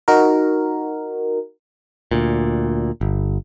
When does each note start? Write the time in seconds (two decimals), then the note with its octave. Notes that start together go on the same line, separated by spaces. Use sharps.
0.08 D#4 F#4 A#4
2.11 D2 A#2
3.01 G1